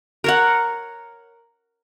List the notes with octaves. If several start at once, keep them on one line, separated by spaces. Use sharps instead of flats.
A#4 C#5 F#5